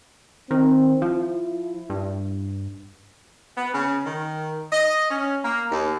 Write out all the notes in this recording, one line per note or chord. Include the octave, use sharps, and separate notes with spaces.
D#3 C4
F3 E4
G2
B3
C#3
D#3
D#5
C#4
A#3
D#2